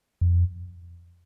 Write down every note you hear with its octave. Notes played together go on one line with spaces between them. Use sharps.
F2